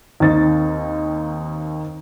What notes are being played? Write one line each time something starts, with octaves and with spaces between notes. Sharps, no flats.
D#2 D#3 C4 D#4 A6